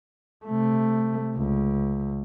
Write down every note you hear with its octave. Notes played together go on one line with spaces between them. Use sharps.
C3 A3
C#2